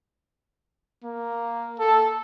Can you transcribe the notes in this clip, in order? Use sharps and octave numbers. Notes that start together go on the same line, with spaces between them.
A#3
A4